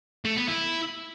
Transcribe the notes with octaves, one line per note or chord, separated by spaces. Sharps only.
A3
B3
E4